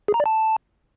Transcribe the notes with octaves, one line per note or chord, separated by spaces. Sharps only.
G#4
A#5
D5
A5